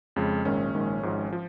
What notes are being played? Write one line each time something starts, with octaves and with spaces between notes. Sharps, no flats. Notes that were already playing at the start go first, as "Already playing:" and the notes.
F2 C#3 G#3
A#1 G#2 D#3 G#3 C#4
A#1 G#2 D#3 G#3
G#1 G#2 F3
F3